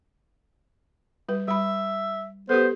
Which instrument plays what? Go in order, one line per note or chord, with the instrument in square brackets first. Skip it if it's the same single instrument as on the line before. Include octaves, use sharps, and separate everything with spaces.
[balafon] G3 B4
[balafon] G3 B5 [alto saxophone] E5
[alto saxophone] B3 [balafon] G4 A4 [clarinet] C5